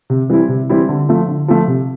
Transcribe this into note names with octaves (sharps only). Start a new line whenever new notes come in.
C3
E3 G3 C4 E4
C3
E3 G3 C4 E4
D3
F3 A3
D3
F3 A3
C3